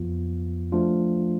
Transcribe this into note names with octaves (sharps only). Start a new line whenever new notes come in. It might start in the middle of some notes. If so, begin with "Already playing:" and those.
Already playing: F2 F3 B3 F4
F3 A3 D4 F4